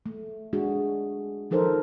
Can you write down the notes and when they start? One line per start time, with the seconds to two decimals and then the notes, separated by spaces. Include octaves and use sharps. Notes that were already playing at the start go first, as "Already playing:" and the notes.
0.06 A3
0.53 G#3 D4 F#4 G#4
1.51 D#3 F3 D#4 A4 A#4 C5